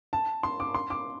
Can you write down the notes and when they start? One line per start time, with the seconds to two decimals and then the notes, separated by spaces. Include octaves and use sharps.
0.13 A5
0.43 C6
0.60 D6
0.74 C6
0.90 D6